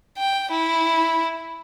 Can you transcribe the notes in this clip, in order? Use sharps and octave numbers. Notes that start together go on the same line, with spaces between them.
G5
E4